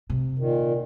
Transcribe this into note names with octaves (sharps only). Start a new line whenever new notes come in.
C3
A#2 D#3